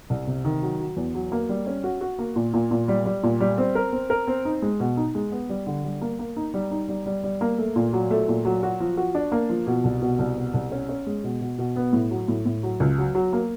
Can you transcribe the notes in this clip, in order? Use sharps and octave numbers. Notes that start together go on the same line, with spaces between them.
C2
C3
D#3
F#3
F#3
E2
F#3
A#3
G3
C#4
F#4
F#4
A#3
A#2
A#2
A#2
G3
G3
A#2
G3
C4
A#4
C4
A#4
C4
D#4
G#3
B2
D#4
G#3
B3
G3
D3
G3
A#3
A#3
D#4
G3
D#4
G3
G3
G3
A#3
A3
A#2
F#3
A3
A#2
F#3
F#4
F3
F#4
D4
A#3
F3
B2
C2
B2
C2
B2
C2
C#4
C#4
G#3
B2
B2
B2
B3
A2
F#3
A2
A2
F#3
C#2
F#3
F#3
A#3